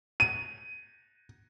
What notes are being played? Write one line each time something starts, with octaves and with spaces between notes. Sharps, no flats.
D#7